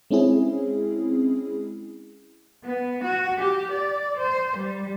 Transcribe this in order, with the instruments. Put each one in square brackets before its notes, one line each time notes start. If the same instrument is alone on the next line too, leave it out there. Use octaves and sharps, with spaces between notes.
[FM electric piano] G#3 C4 C#4 E4 G#4
[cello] B3
F#4
G4
D5
C5
G3